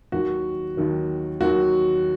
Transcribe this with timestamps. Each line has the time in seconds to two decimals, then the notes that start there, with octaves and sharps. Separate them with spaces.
0.12 D#2 D#3 F#3 F#4
0.77 D#2 D#3 F#3
1.41 D#2 D#3 F#3 F#4